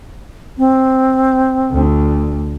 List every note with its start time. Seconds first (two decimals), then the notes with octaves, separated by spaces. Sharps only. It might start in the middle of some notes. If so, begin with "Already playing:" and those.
0.58 C4
1.71 D2